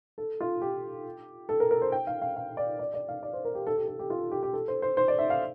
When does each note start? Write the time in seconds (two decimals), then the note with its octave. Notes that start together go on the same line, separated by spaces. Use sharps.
0.18 A4
0.41 F4
0.62 G4
1.49 A4
1.60 A#4
1.71 A#4
1.82 C5
1.92 G5
2.07 F5
2.22 F5
2.36 F5
2.57 D5
2.79 D5
2.94 D5
3.09 F5
3.23 D5
3.33 C5
3.45 A#4
3.55 G4
3.67 A4
3.77 G4
3.88 A4
3.99 G4
4.10 F4
4.31 G4
4.43 G4
4.53 A4
4.68 C5
4.82 C5
4.97 C5
5.08 D5
5.19 E5
5.30 F5